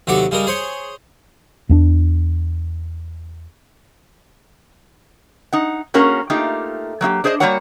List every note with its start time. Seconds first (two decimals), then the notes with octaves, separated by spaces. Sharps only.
0.07 D#2 C3 F#3 F#4 A4 D6
0.31 C#3 G3 G#3 A#4
0.47 G#4 C5 C#5
1.69 E2 A#3 D4
5.53 D#4 F#5
5.94 A#3 C#4 F#4 G#4 A#4
6.30 A3 A#3 D#4 F4 G4
7.01 F#3 A#3 D#4 G4
7.24 D4 G#4 C5 C#5 D#5
7.40 G3 G#3 A#3 F#4 C#5 F#5